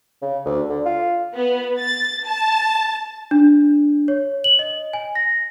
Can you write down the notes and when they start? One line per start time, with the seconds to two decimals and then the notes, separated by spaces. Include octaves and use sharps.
0.22 C#3
0.45 D2
0.69 D3
0.85 F4
1.35 B3
1.79 A6
2.26 A5
3.31 D4
4.08 C#5
4.44 F#7
4.59 D#5
4.93 G#5
5.15 A#6